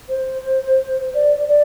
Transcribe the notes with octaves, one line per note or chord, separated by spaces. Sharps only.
C5
D5
D5